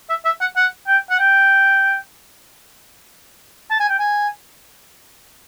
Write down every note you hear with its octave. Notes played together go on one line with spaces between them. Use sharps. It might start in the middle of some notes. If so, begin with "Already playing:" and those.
E5
E5
F#5
F#5
G5
F#5
G5
A5
G#5
G5
G#5